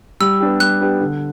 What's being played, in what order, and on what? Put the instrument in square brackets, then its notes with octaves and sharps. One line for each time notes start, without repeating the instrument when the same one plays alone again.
[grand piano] G3 [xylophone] E6
[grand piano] B3 D4 G4
[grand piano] G3 [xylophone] F#6
[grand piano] B3 D4 G4
D3